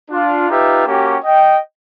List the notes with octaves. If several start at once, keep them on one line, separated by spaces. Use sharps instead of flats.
D4 F4
D#4 F4 G4 B4 E5
A#3 C#4 F#4 G4
D#5 G5